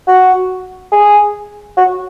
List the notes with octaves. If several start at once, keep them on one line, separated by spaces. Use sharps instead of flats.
F#4
G#4
F#4